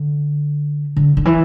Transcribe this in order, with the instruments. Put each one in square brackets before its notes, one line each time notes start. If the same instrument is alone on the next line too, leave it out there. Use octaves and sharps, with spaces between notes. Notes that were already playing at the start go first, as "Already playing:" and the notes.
Already playing: [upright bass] D3
D3
D3
E3